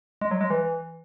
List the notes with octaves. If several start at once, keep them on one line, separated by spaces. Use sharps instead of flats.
G#3
F#3
G#3
E3